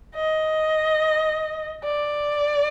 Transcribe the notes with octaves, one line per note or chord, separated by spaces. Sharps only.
D#5
D5